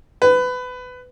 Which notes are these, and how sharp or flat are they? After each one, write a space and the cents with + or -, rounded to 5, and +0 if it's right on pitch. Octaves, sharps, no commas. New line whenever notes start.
B4 +20